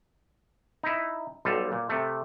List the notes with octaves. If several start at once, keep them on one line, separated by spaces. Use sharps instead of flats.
D#4 E4
B1 G3 F4 A4
A#2
C3 A3